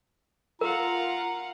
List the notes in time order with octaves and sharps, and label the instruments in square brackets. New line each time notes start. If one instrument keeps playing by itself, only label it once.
[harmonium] F4 [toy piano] A#4 [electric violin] F5 F#5 [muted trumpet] A#5